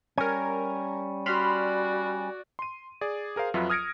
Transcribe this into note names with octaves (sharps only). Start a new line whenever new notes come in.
G3 C#4 A#4 G#6
F#4 D5 B5 C6 F6
C6 D#7
G#4 D5
G#4 A#4 C5 F5
F2 F#3 F4 B4 E5
D#6 F6 G#6 A#6 C#7 D7